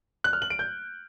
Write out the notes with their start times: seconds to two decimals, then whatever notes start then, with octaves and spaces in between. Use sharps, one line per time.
0.24 F#6
0.33 F6
0.42 F#7
0.50 D7
0.59 G6